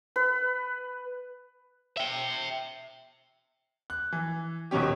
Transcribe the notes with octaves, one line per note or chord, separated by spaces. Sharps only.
B4
E5 G5
F#6
E3
D#1 B2 D#3 G3 C#4 G4